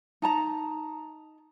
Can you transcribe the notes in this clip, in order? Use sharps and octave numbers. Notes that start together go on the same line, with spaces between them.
D#4 A5 A#5